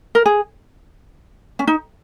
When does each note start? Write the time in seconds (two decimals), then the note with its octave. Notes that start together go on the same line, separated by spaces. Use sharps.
0.15 A#4
0.26 G#4
1.59 C#4
1.67 D#4